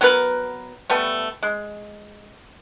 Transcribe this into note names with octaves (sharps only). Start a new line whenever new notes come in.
F#3 B3 A#4 B4
G3 A3 B3
G#3